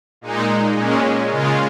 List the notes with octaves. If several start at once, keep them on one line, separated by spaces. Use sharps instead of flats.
A#2 G#3 D#4
A#2 G#3 C#4
C#3 G#3 F4